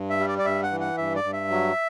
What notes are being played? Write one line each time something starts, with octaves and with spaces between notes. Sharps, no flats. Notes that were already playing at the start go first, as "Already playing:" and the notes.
Already playing: G2
E5
G3
D5
D5
G2 E5
F#5
E3
F#5
G2 E5
D5
G2
E5
F#3